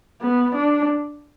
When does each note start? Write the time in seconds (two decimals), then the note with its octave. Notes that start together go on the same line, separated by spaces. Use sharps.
0.21 B3
0.55 D4